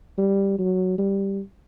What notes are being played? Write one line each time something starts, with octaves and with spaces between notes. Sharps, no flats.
G3
F#3
G3